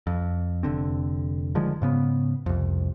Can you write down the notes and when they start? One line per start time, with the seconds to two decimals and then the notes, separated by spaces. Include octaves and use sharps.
0.07 F2
0.63 F1 D3 C4
1.55 D3 D#3 F3 G#3
1.82 G#2 C#3 B3
2.46 C2 F2